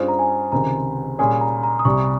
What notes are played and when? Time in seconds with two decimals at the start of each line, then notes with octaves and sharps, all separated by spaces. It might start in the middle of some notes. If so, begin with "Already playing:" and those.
Already playing: G2 G3 C#4 F4 G#4 C5
0.08 A#5
0.19 G#5
0.52 C#2 C3 D#3 A#5
1.18 A#2 G3 C#4 G#4 C#5 G#5
1.41 A#5
1.63 A#5
1.79 D#6
1.85 C2 C3 G3 C#6